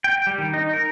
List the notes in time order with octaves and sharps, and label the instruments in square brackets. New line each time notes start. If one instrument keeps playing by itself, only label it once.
[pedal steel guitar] G5
G3
D#3
D#4
A#4